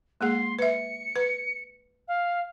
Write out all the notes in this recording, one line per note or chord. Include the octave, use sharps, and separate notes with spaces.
G#3 A#3 G#4 C6
B4 E5 C#7
B4
F5